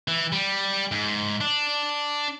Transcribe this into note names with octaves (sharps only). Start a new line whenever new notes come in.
E3
G3
G#2
D4